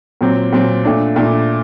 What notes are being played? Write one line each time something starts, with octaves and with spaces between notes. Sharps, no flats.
A#2 F#3 C4
A#2 F#3 C4
A#2 A3 D4
A#2 A3 D4